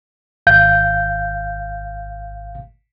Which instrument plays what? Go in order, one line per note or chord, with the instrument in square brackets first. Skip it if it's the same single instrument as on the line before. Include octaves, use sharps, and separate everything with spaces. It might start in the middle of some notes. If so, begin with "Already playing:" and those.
[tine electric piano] G#1 F5 G6